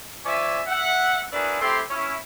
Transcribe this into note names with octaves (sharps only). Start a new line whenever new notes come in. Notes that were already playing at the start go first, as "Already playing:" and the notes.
F3 C#4 D5 E5 G#5
E5 F#5
D4 E4 F#4 G#4 A#4 B4
A3 C4 E4 G4 G5 C6
C#4 E4